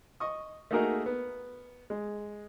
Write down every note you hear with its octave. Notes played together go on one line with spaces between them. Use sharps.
D#5 C#6 D#6
A3 A#3 D#4 F#4 G#4 A#4
B3
G#3